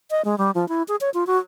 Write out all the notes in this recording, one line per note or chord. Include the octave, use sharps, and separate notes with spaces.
D#5
G#3
G3
F3
E4
G#4
C#5
F4
F#4